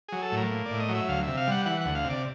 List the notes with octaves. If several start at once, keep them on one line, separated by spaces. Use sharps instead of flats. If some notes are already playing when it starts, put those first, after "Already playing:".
F#3 G#4
A4
A2
A#4
A#3
A2 D5
D#5
F#3
E5
D2 F5
C3 E5
F5
G3 F#5
E3 F#5
D2 F#5
F5
C3
D5